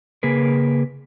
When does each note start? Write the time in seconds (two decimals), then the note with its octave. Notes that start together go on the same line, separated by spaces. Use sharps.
0.23 C#3 A#3 G#4 A#4 B4